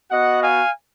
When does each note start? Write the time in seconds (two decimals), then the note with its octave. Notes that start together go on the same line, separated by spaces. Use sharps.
0.11 B3 F#4 D#5 F#5
0.42 F5 G#5